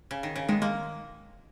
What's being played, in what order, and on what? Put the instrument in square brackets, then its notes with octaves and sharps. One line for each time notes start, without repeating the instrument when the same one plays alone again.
[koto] C#3
D#3
C#3
[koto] D#3 [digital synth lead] G#3
[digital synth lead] G#3 [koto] A#3